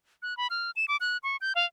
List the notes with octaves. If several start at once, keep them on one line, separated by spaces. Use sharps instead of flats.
F#6
B5
F6
E7
D6
F#6
C#6
G6
F5